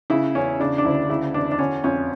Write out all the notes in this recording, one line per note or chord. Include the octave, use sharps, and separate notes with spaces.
C#3 E4
E2 C#4
C#3 D4
D4
D2 E4
C#3 E4
E2 D4
D4
D3 C#4
F2 C#4